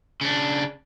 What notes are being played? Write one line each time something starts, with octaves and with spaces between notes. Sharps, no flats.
C#3 D4